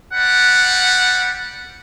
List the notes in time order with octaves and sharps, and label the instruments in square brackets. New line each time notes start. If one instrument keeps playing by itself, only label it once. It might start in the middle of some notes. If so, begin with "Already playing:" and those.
[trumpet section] G3 F#5